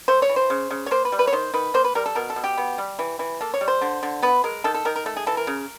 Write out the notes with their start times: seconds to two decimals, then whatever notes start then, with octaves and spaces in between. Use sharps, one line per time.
0.08 A3 C5
0.22 C#5
0.29 E3
0.36 C5
0.50 C#3
0.71 C#3
0.86 C#5
0.91 A#3 C5
1.05 B4
1.12 G3
1.19 B4
1.27 C#5
1.33 D#3 C5
1.54 D#3 B4
1.74 A#3 C5
1.84 B4
1.95 G3 A#4
2.06 A4
2.15 B2 A#4
2.30 A4
2.36 B2
2.44 G4
2.58 B3
2.78 G3
2.99 E3
3.19 E3
3.41 A#3 A4
3.54 C#5
3.61 G3
3.68 C5
3.82 D3
4.03 D3
4.23 B3 B4
4.44 G#3 A#4
4.64 D#3 A4
4.74 A4
4.85 D#3 A#4
4.96 A#4
5.06 A3 A4
5.17 G#4
5.27 E3 A4
5.37 A#4
5.47 C#3